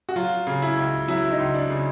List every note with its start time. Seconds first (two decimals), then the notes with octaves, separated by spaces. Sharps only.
0.09 F#4
0.16 F#3 F4
0.47 C#3
0.62 E4
0.77 C#2
1.08 F#3 E4
1.31 D#4
1.38 C#2
1.54 D4
1.70 C#3